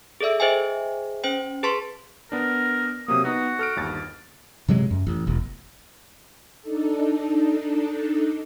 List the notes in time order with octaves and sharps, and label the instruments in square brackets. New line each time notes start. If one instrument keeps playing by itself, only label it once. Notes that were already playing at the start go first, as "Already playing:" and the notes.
[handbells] G#4 A4 D5 E5 E6
G#4 C5 D#5 E5 G5 G#5
C#4 C5 G5
G#4 B4 A5 C6 C#6 B6
[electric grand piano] B3 D4 [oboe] A#4
[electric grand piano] C3 F#3 A#3 [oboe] D#6
[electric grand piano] B3 D#4 [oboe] F#4
[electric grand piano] A4 F6 D7
G1 D#2 A6
[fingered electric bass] A2 C3 F#3 G#3
F#2
A1
E1 A1
[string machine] D4 D#4 A4